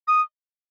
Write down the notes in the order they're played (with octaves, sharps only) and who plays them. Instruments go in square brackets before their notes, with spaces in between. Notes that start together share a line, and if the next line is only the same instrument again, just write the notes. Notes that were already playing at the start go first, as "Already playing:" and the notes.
[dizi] D#6